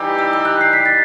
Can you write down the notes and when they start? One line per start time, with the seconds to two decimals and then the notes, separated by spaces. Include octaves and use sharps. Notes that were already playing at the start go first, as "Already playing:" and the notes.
Already playing: E3 G3 D#4 G4 E6
0.19 E6
0.33 E6
0.45 F#6
0.61 C7
0.73 B6
0.86 A6